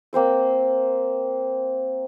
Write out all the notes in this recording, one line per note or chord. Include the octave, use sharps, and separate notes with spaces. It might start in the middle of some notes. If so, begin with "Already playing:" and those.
A#3 C4 C5 E6